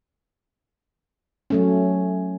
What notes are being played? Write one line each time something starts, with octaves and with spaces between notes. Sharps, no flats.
F#3 A3 C#4